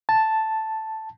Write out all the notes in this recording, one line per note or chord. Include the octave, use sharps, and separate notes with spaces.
A5